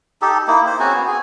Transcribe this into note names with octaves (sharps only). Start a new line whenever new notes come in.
D#4 G4 A4
A#3 D#4 E4
C5
C4 C#4 F#4 G#4
B3
G#4